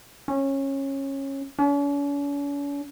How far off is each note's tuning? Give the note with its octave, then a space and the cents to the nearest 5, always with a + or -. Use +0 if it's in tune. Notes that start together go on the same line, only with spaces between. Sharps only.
C#4 -20
C#4 +45